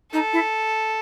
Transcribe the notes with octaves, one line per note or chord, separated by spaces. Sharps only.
D#4 A4
E4